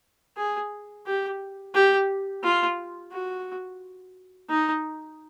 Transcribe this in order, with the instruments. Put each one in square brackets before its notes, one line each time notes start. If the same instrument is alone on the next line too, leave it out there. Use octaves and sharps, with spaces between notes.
[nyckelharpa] G#4
G4
G4
F4
F#4
D#4